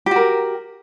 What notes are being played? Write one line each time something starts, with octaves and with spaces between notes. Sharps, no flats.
F#4 G4 A#4